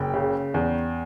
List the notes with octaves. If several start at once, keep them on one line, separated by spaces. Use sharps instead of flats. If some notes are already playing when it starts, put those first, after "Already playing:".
Already playing: F#1 G5
C#3
E2